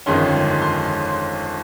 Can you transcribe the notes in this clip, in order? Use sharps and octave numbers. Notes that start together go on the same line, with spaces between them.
G1 F2 D#3 G#3 C#4 C6
C6